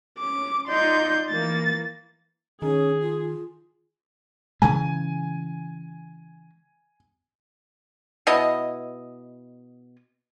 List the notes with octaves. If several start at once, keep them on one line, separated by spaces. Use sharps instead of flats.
C#4 D6
D#4 F4 D5 C6 G6
E3 A#3 A6
D#3 C#4 G#4
F4
C#3 E3 G#3 G#5
B2 E4 D#5